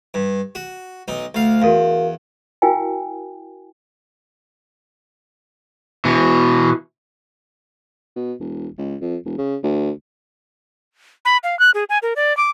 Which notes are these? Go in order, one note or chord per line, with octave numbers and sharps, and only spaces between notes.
G2
F#4
B1 D#4
D2 F5
E2 F#4 A#4 F5
E4 F#4 A#4 F5 G5 G#5
B2 E3
B2
E1
C#2
F2
E1
C#3
D2
B5
F5
F#6
G#4
G#5
A#4
D5
D6